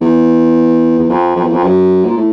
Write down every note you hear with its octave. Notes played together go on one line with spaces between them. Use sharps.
E2
E2
F2
F2
E2
F2
F#2
A#2
A2